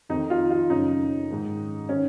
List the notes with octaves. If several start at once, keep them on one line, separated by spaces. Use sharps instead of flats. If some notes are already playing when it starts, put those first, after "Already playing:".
F2 D#3 D#4
F4
F4
F#2 C#3 D#4
G#2 D#3
D#3 C#4